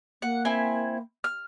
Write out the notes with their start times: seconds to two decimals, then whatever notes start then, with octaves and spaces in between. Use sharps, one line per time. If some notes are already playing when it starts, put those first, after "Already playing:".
0.22 A#3 F#5
0.45 C4 E4 G#5
1.24 F6